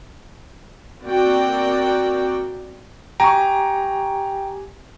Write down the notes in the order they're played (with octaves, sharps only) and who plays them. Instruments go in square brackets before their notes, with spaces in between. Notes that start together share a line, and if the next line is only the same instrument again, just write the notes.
[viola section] A#3 C4 F#4 A#4 D5 G5
[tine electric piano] G4 G#5 [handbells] G5 [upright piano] A#5 C#6